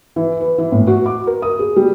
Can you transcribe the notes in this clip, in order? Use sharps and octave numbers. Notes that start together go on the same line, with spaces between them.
E3
B4
E3
A2
F#4
D6
A#4
D#6
G#4
G3